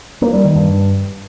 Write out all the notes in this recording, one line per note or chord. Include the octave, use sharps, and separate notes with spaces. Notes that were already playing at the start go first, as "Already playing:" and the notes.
A#3
G3
D#3
G2